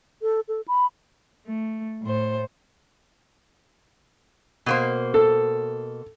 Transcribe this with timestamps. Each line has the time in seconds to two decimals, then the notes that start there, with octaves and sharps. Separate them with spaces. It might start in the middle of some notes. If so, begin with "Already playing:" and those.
0.22 A4
0.48 A4
0.68 B5
1.47 A3
2.03 A2 C5
4.66 B2 A#3 C5
5.14 A4